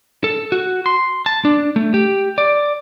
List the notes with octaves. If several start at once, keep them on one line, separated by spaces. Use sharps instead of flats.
A4
F#4
C6
A5
D4
A3
G4
D5